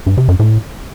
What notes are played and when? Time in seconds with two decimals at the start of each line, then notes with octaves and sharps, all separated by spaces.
0.06 G2
0.17 C3
0.28 F#2
0.39 A2